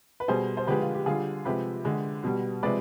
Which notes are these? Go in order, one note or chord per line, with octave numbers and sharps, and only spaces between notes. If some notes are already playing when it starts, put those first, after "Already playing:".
B4
B2 G3 G#4 C5
C5
D3 F3 G#3 G4 B4
F4
G4
D3 G3 F4 G#4
C3 F3 G#3 G4 B4
D3 G#3
B2 G3
C3 F3 G#3 B4 D5